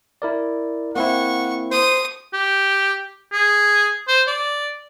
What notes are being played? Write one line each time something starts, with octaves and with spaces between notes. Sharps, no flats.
E4 A#4 D5
A#3 C4 E4 F#5 C#6
C5 D#6
G4
G#4
C5
D5